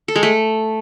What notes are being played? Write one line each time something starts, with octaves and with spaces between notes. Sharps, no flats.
A4
G#3
A3